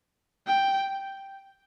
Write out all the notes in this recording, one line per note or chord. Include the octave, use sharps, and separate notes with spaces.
G5